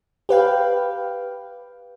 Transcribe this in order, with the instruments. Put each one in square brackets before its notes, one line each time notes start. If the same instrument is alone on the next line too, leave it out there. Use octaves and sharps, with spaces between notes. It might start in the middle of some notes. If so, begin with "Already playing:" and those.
[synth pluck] G4 B4 F5 G5